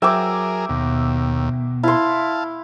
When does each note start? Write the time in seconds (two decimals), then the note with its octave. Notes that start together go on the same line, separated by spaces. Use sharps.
0.02 F#3 G#4 A#4 E5 G5 D6
0.69 D#2 B2
1.83 E4 F5 A5 C6